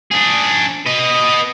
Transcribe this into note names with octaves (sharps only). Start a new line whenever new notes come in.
D4 G#4
B4 D#5